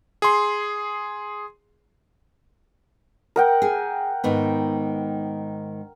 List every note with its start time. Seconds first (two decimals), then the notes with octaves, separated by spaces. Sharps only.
0.22 G#4 C6
3.36 A#4 F#5 G5
3.62 G#4
4.24 G#2 D#3 B3